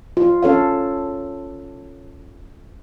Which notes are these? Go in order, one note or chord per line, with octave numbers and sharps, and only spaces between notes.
F4
C#4 A4 C#5 F5